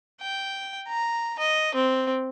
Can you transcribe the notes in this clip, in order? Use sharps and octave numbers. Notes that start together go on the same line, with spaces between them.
G5
A#5
D#5
C4